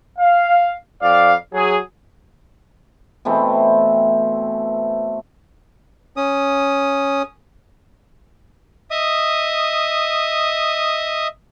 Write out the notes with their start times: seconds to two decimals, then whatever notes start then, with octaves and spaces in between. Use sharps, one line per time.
0.18 F5
1.02 F2 D5 F5
1.53 F#3 G#4
3.25 B2 E3 A3 C4
6.17 C#4 D#6
8.91 D#5 E5 D#6